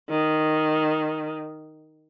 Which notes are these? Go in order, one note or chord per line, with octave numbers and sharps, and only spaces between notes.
D#3